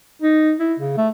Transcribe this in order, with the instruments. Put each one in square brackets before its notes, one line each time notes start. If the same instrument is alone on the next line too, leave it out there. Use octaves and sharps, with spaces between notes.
[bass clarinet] D#4
E4
C#3
A3